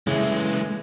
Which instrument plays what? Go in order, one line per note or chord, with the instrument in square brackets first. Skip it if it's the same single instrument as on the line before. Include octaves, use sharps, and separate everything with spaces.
[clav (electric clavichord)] C#3 [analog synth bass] E3 [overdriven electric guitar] G#3 A3